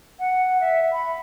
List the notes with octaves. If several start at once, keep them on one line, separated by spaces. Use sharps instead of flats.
F#5
E5
B5